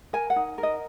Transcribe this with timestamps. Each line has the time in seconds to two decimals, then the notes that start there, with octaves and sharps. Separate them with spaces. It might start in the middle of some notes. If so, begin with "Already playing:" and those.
0.13 A#4 G#5
0.30 F#5
0.36 D#4
0.58 A#4
0.63 D#5